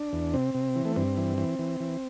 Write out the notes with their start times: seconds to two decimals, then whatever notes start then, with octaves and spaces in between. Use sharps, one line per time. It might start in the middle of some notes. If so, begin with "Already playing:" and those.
Already playing: D4
0.13 E2
0.34 C3 C4
0.54 C3
0.76 E3
0.85 A3
0.96 G2 C4
1.17 E3
1.38 E3
1.59 E3
1.80 E3